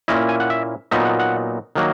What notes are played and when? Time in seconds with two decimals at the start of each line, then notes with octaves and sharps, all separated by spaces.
0.08 A#2 A#3 C#4 E4 D#5
0.29 G#5
0.40 F#5
0.50 E5
0.91 A#2 F#3 B3 D#4 E5
1.05 F#5
1.20 F#5
1.75 D#3 F#3 A#3